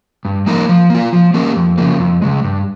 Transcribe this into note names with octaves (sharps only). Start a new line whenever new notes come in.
G2
F3 A#3 D#4 A#4
F3
A#3 F4
F3
A#3 C#4 G4 A#4
F2
C#3 F3 A#3
F2
C#3 G#3
G2